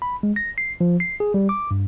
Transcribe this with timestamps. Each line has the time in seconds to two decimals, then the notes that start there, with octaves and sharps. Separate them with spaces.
0.02 B5
0.23 G#3
0.36 A#6
0.58 C7
0.81 F3
1.00 C7
1.20 G#4
1.34 G3
1.49 D6
1.71 G2